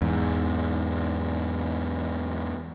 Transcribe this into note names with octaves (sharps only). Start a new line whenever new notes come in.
E2 G#2